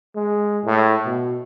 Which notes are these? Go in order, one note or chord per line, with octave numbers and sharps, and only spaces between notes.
G#3
A2
B2